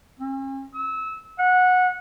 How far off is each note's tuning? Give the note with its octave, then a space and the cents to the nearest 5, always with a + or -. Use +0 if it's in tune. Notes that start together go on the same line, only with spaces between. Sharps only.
C#4 -45
E6 -25
F#5 -15